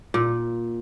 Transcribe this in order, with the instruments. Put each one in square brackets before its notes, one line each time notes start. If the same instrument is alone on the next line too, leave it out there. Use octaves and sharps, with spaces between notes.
[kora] A#2